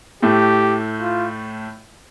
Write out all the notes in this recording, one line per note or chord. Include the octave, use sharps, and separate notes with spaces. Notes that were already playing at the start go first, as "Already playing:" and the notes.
A2 A3 G4
F4